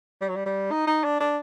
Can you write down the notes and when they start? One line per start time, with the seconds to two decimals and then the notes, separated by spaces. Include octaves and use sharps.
0.21 G3
0.28 F#3
0.35 G3
0.46 G3
0.71 D#4
0.87 D#4
1.04 D4
1.20 D4